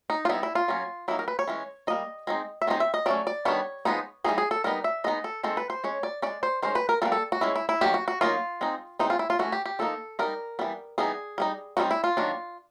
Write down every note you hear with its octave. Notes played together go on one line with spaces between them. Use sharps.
D#4
F4
G3 B3 D#4 E4
E4
F4
F#3 A#3 C#4
F#3 A#3 D#4 E4
A#4
B4
C#5
E3 G#3 C#4
G3 A#3 D#4 D#5
G#3 C4 D#4
E5
D#3 G#3 C4 D#4
E5
D#5
F#3 A3 C#4 D5
D5
D#3 G3 B3 D4 C#5
F3 G#3 B3 D#4
E3 G3 C4 D#4 G#4
G#4
A4
G3 B3 D#4 A#4
E5
G#3 B3 D#4 D#5
A4
D#3 G#3 C4 A4
B4
C5
G#3 C#4 C#5
D5
G#3 C#4 D5
C5
D#3 G#3 C#4 C5
B4
A#4
G3 A#3 D4 A4
A4
F#4
G#3 C#4 E4
E4
E4
D#3 F#3 A#3 G4
F#4
F#4
F#3 A#3 D#4 F4
G#3 C4 D#4
E3 G#3 C4 D#4
F4
E4
F4
E3 A3 C#4 F#4
G4
G4
F3 A#3 D#4 A4
G3 B3 D#4 A#4
E3 G3 B3
E3 G3 B3 D#4 G#4
G3 B3 D#4
D#3 G3 C4 D#4 F#4
E4
F4
D#3 F#3 A#3 D4